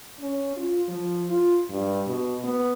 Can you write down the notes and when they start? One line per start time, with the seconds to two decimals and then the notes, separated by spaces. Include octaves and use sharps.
0.19 C#4
0.57 F4
0.88 F3
1.30 F4
1.70 G2
2.06 B2
2.44 B3